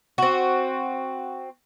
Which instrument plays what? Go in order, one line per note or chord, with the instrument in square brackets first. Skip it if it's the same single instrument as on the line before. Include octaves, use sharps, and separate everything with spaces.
[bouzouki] C4 F#4